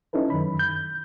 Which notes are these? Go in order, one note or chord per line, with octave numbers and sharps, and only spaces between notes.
C#4 D#4 E4 A4 B4
F#2 D#3 B5
G6